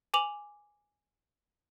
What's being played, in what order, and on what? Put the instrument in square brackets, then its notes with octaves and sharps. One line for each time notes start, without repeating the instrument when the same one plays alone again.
[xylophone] G#5 D6 F7 F#7